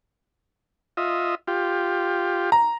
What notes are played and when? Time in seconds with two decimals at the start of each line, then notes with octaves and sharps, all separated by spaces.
0.97 F4 D#5 E5
1.48 F4 G4
2.52 A#5